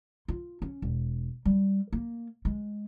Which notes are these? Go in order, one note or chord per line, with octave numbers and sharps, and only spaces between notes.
F4
C#4
E1
G3
A#3
G#3